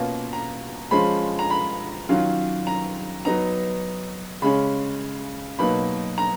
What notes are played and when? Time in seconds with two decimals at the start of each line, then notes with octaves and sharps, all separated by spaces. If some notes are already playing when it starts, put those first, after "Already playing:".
Already playing: B2 A#3 C#4 F4
0.33 A#5
0.91 F3 G#3 C#4 F4 B5
1.39 A#5
1.51 B5
2.09 D#3 F#3 C#4 F4
2.67 A#5
3.25 F#3 B3 D#4 A#5
4.42 C#3 G#3 C#4 B5
5.59 B2 F#3 A#3 D#4 B5
6.18 A#5